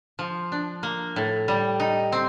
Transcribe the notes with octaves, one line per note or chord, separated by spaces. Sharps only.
F3
D4
A#3
A2
G3
D#4
C4